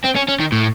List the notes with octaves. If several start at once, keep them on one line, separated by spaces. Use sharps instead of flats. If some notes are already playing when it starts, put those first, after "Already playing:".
C4
C#4
C#4
D#3
A2